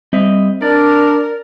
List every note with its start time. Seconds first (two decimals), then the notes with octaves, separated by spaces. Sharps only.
0.13 G3 C4 D#5 E5
0.62 D4 A#4 D5